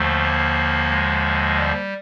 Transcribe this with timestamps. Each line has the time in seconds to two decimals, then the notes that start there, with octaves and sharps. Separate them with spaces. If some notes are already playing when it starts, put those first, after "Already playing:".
Already playing: D#2 D3 F3 A3
0.22 A#3
0.90 G#3
1.58 G3